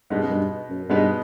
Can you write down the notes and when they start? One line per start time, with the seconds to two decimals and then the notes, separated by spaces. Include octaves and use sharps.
0.10 G2 B2 G#3 B3 D#4
0.21 F#2
0.30 G2
0.69 F#2
0.89 G2 B2 G#3 B3 D#4